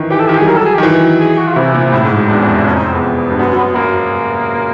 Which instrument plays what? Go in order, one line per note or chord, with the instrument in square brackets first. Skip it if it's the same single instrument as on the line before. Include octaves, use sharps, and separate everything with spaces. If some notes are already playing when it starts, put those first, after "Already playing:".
Already playing: [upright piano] D#3 E3
[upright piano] E3 [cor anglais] G4
[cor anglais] A4
[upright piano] D#3 [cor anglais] G4
[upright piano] G3 [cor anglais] G#4
[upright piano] F#3 [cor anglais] A#4
[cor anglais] A4
G#4
[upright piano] D#3 [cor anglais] G4
[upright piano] E3
[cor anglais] G#4
G#4
F#4
F4
[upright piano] C3 [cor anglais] E4
[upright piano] A#2
[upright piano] A2 [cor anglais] E4
[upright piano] G#2
F#2
[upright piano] E2 [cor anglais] D4
[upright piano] F2
F#2
[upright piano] F2 [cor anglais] C#4
[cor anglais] D#4
C4
[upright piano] E2 [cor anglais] B3
[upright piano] F2
G2
[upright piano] F#2 [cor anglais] B3
[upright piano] F#2
[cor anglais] B3
[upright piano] F#2 [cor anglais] A#3